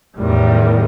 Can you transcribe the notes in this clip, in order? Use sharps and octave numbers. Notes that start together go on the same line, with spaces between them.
E2 A2 D#3 G3